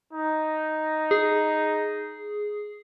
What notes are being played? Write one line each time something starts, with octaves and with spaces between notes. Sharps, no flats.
D#4
G#4